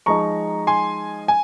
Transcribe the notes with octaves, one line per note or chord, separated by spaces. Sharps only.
F3 G#3 D#4 A#5 C#6
G#5 C6
G#5